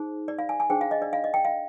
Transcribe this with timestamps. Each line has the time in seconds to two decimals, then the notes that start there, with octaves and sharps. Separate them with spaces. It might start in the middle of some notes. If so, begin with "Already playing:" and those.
Already playing: D#4 G#4 C5
0.28 D5
0.39 F5
0.49 G#5
0.60 G#5
0.70 D4 G#4 C5 G5
0.81 F5
0.91 D#5
1.02 D5
1.13 F5
1.24 D#5
1.34 G5
1.45 F5